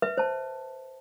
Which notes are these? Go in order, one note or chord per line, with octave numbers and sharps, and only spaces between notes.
B4 E5
C5 A5